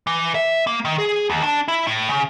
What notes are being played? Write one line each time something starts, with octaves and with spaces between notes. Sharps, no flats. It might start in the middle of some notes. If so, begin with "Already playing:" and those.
E3
E5
A#3
D#3
G#4
D#2
D4
E4
A2
C#3